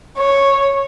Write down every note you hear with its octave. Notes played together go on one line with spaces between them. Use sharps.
C#5